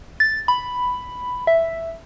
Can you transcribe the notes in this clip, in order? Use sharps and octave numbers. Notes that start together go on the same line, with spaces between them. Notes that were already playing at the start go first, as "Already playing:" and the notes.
A6
B5
E5